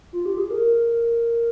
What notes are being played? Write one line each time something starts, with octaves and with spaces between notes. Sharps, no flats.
F4
G4
G#4
A#4